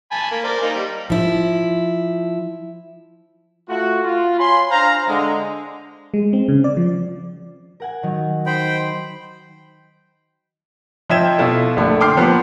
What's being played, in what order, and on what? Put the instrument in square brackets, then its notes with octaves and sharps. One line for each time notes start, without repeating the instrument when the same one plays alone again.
[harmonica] G#5 A5 B5
A#3
A#4 C5 D5
A#3 D#4
G3
[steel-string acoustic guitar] F3 E4
[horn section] A3 F4 F#4
F4
C#5 G#5 B5 C6
D4 C5 F5 A#5
D3 G#3
[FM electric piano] G#3
C4
C#3
D5
F3
[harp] A#4 F#5 G#5
D#3 F#3
[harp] D#4 [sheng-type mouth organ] C5 G5 B5
[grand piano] F3 D#5 E5 G5 G#6 E7
B2 E4 F4 A4
A#1 D3 A3
G5 C6 D6 F6 C7
F3 A#3 B3 B4